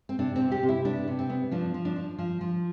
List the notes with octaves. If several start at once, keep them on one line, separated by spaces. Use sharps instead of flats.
C4
C3 D4
C4
C3
G4
C3
E4
B3 D4
C3
C4
B3
F3 D4
F3
D4
F3
F3
F3